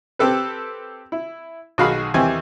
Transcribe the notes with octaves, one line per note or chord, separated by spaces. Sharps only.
C4 G4 A4 B4
E4
B1 D#3 F#4 G#4 F5 B5
D#2 E3 C4 G4 G#5